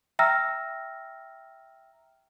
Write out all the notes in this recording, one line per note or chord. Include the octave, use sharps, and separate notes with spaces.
E5 G5 A#5 E6 F6 A#6